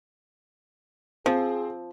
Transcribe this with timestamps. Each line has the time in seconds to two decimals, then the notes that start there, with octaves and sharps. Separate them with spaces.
1.26 F3 C4 G#4